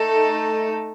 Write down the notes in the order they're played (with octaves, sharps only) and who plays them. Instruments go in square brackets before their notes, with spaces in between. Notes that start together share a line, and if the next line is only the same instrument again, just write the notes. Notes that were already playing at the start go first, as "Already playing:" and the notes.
Already playing: [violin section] A3 D#4 A4